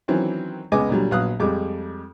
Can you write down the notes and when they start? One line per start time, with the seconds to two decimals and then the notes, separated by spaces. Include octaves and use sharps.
0.08 D#3 E3 F#3 C4 C#4
0.72 C#2 G#3 B3 D#5 G#5 D6
0.89 A#2 D3 F#3 G3
1.11 A#1 F#3 B3 F5 D#6 F#6
1.40 F2 G3 G#3 D6